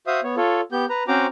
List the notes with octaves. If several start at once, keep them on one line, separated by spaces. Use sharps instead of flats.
F#4 C5 E5 F5 D#6
B3 C#5
F4 A4 C#5
B3 G4 G6
B4 A#5
C4 C#4 F#4 C5 A#5 D6